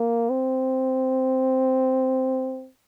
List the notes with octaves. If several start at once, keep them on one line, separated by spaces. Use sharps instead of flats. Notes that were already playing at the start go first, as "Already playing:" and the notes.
Already playing: A#3
C4